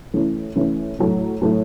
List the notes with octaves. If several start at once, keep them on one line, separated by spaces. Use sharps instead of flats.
E3 A3 C#4 E4
E3 A3 C#4 E4
A2 F#3 A3
A2 F#3 A3